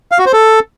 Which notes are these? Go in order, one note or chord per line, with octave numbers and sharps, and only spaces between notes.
F5
F#4
C5
A4